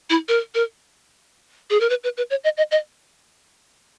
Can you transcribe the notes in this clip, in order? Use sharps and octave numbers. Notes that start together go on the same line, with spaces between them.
E4
A#4
A#4
G#4
A#4
B4
B4
B4
C#5
D#5
D#5
D#5